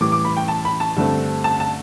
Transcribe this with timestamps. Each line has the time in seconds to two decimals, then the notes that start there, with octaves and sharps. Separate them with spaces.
0.01 A2 E3 G3 D6
0.12 D6
0.25 B5
0.37 G5
0.48 A5
0.65 B5
0.80 A5
0.96 G2 D3 A3 C4
1.44 A5
1.60 A5